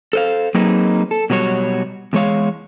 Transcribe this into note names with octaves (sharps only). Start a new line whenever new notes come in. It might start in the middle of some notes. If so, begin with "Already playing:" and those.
A4 C5 F5
F#3 A#3 C4 D#4 G#4 B4
A4
B2 F#3 G3 D4 C#5
E2 G#3 C#5 F5